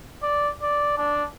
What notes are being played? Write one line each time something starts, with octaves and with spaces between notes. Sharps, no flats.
D5
D5
D4